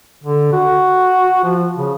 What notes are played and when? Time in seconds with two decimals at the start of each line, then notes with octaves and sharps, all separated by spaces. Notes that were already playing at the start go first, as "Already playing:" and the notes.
0.24 D3
0.52 F#4
1.44 F3
1.77 C#3